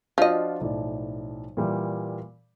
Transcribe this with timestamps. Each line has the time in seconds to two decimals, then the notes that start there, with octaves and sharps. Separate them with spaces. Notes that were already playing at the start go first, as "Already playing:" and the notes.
0.18 F3 D4 F4 F#4 D#5
0.61 B1 A2 D5
1.57 A#2 E3 G3